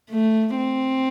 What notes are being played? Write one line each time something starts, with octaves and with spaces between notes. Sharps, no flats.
A3
C4